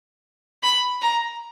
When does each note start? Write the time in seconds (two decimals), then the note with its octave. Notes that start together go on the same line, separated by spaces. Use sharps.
0.63 B5
1.02 A#5